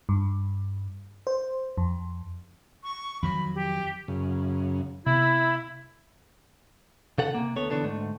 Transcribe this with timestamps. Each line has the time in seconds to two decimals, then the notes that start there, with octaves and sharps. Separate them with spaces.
0.09 G2
1.27 C5
1.77 F2
2.84 C#6
3.22 F2 D#3 F#3 B5
3.55 G4
4.08 F#2 C#3
5.06 C3 B3 E4 E5 B5
7.18 C#3 A4 F#5
7.35 C3 A#3
7.56 D2 B3 A4 C#5
7.70 D3 E3 B3 D4 A4
7.84 D2 G#2 A3